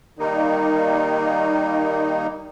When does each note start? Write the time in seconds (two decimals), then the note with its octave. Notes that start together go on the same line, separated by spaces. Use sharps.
0.19 D#3 G3 A#3 D#4